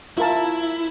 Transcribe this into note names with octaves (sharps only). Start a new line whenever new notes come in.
E4 F4 A#4 A5